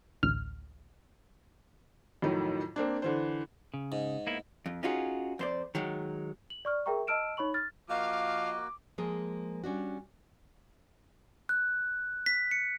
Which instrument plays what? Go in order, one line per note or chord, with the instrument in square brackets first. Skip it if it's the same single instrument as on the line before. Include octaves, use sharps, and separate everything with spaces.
[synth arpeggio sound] A1 D2 F6
[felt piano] F2 A2 D#3 F#3
A#3 C4 D4
D3 E3 C5
[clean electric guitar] C#3
[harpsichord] G#2
[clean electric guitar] A#3 B3 E4
[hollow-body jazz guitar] F2
C#4 D#4 F4 F#4 G#4
F2 C5 D5
D#3 F#3 G#3
[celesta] F#7
D5 C#6 F6
G#4 A#4 E5 G5 A#5 C#6
D#5 A5 E6 F6 D7 E7
D#4 C#5 B5 C#6 F#7
F6 A6
[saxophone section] F3 A#4 D#5 [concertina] A#3 F#4 [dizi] F5 [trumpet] D6
[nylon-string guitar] F3 G#3 A#3 G#4
G3 C#4 D4 F#4
[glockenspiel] F#6
B6
C#7